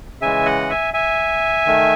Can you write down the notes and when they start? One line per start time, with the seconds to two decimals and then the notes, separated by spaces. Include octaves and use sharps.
0.21 C#3 E3 G#3 E5 G#5
0.45 D#5 F#5
0.70 E5 G#5
0.94 E5 G#5
1.66 D#3 A3